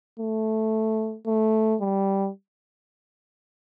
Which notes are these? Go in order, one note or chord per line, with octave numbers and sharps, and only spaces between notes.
A3
A3
G3